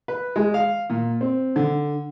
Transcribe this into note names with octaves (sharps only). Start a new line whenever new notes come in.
B4
G#3
F5
A#2
C4
D3